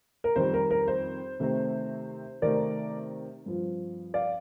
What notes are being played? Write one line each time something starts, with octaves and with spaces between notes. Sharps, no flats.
A#4
F2 D#3 G3 C5
A#4
A#4
C5
C3 D#3 A3 C4
C3 D#3 A3 C4 A#4 D5
G2 F3 C4
D5 F5